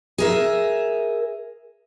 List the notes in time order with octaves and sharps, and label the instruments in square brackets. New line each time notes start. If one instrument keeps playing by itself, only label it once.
[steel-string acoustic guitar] G#4 A#4 E5